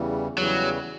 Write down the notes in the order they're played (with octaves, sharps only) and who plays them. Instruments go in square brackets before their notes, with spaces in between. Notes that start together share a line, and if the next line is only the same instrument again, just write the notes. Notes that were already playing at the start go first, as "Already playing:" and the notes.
Already playing: [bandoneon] E2 C#3 E3 G3
[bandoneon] E2 C#3 E3 G3 [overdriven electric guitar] F#3